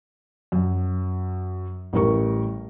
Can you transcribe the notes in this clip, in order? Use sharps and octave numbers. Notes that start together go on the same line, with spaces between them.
F#2
A1 G3 A#4 C#6